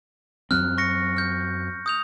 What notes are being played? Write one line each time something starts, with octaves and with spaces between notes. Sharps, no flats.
F#2 F#3 C4 F6 F#6
C#6 A#6 C#7
F6 G6
D#6 G6 F7